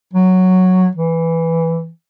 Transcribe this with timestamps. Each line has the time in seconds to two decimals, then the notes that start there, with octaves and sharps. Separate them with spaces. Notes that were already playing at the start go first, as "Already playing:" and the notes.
0.14 F#3
0.95 E3